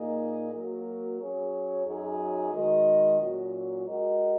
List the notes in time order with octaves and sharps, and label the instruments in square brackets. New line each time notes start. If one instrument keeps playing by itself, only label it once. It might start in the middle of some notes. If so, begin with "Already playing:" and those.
Already playing: [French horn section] A#2 A#3 D#4 G#4 D#5
F#3 A#3 F#4 A#4
F#3 C#4 G#4 C#5
F#2 F#3 D#4 G#4
D#3 G#3 F#4 D#5
A#2 F#3 C#4 F#4
G#3 F#4 A#4 D#5